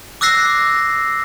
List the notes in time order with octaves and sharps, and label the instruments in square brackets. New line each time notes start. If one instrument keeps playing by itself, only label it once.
[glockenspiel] D6 E6 F#6 A#6 C7